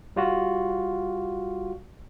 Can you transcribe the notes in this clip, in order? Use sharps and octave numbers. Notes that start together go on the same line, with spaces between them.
G3 F4 F#4